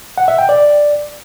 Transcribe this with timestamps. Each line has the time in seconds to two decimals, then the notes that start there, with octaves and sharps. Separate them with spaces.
0.18 F#5
0.28 E5
0.38 G5
0.49 D5